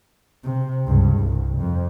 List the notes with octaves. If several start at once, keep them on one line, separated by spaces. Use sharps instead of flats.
C3
C#2 G2
C2
F2